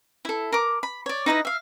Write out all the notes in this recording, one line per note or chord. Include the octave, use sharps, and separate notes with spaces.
E4 A4
A#4 D6
B5
C#5 D5
D#4 E4 B4 D#5
E5 F5